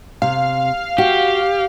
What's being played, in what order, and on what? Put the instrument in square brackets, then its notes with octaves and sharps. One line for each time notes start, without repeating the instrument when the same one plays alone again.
[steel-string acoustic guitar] C3 [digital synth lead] F5
[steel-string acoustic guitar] F#4 [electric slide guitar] G4